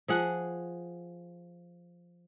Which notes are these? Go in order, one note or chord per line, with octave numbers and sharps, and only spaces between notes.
F3 G#4 F#5